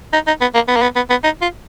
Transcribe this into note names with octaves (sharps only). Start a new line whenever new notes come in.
D#4
D#4
B3
A#3
B3
A#3
B3
B3
B3
D#4
F4